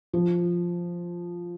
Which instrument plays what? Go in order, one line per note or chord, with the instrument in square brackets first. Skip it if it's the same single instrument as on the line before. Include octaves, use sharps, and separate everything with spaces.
[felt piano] F3